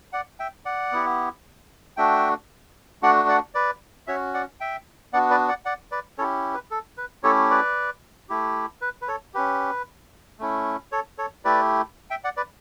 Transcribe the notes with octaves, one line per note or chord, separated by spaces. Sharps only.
D5 F#5
E5 G5
D5 F#5
B3 E4 G4
A3 D4 F#4 E5 G5
A3 D4 F#4 D5 F#5
D5 F#5
B4 D5
C#4 F#4 C#5 E5
D5 F#5
E5 G5
B3 D4 F#4 D5 F#5
B4 D5
D5 F#5
D5 F#5
B4 D5
C#4 E4 G4 A4 C#5
B4
A4
B4
A3 C#4 E4 G4 A4 C#5
B4 D5
A3 E4 G4
B4
B4
A4 C#5
C#4 G4 B4
A3 C#4 E4
A4 C#5
A4 C#5
A3 E4 G4 B4 D5
E5 G5
D5 F#5
B4 D5